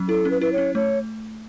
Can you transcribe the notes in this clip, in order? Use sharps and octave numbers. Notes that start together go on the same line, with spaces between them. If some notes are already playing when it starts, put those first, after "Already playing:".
Already playing: F#3 C#4
E4 A4
C#4
B4
E4 B4
C#5
C#4
A3 C#5